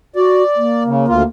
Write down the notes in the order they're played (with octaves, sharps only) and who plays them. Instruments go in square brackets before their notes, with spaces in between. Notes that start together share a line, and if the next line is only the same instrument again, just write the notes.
[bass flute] F#4 [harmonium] D5
[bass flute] A#3
[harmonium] C#3
D2 F4